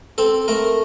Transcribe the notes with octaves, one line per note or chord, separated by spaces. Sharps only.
C4 A4
A3 A#4